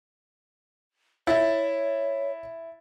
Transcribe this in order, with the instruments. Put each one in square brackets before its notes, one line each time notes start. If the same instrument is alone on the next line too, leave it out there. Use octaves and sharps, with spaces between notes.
[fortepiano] E4 [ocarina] C#5 [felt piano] E5 A6